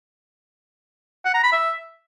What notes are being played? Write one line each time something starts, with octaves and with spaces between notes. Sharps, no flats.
F#5
A#5
B5
E5